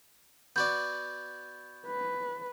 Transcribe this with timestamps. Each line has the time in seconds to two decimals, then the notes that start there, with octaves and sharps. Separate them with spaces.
0.56 B3 F#4 D5 G6
1.86 B4